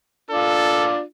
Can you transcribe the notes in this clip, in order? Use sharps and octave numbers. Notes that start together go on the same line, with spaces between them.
D4 F4 A4